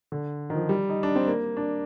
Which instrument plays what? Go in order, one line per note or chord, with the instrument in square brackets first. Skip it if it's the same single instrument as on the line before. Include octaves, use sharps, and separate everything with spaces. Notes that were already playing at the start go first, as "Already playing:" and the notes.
[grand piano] D3
D#3
F3
G3
D#4
D4
C4
A#3
D4